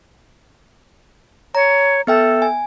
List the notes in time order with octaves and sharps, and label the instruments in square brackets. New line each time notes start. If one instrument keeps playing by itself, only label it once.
[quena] C#5 [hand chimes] A#5
[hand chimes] B3 E5 G5 [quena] A4
[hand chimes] G#5